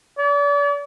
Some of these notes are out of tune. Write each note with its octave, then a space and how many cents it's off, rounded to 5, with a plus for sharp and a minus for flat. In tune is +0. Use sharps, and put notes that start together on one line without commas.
D5 -40